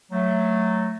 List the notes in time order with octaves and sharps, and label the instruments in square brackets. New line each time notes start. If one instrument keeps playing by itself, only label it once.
[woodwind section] F#3 A3